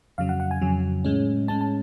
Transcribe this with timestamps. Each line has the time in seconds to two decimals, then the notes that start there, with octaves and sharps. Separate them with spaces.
0.18 F2 C#3 F#3 F5
0.29 F#5
0.40 F#5
0.51 G#5
0.62 F2 C#3 F#3
1.04 A2 G#3 C#4
1.48 A2 G#3 C#4 A5
1.61 A5